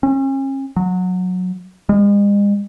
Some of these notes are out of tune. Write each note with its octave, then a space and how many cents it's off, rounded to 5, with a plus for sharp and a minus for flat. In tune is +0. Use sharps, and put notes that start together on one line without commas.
C#4 -40
F#3 -20
G#3 -40